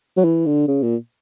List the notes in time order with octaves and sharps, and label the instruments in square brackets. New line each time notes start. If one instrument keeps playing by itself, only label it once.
[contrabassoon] F#3
E3
D3
C#3
A#2